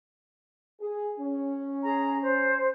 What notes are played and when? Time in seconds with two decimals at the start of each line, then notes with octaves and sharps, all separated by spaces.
0.80 G#4
1.19 C#4
1.84 G#4 A#5
2.20 C5